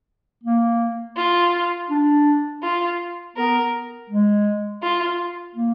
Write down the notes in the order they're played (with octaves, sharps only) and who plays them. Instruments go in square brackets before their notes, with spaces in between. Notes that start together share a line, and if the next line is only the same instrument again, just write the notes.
[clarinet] A#3
[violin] F4
[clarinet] D4
[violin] F4
[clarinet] B3 [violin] A#4
[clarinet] G#3
[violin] F4
[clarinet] A#3